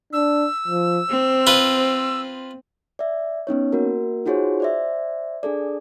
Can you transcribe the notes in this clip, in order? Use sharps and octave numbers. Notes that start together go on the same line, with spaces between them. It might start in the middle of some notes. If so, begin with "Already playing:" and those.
D4 E6
F3
C4 C5
F4 B4
D5 E5
B3 C#4 D#4 C#5
A#3 F#4 A#4
D#4 F4 F#4 G#4 C5 C#5
C5 D5 E5
D4 G#4 A4 D5